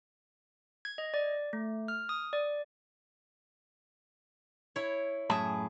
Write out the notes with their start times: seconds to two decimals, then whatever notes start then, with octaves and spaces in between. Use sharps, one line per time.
0.85 G#6
0.98 D#5
1.14 D5
1.53 A3
1.88 F6
2.09 D#6
2.33 D5
4.76 E4 C#5
5.30 F#2 A2 G#4 E5 A5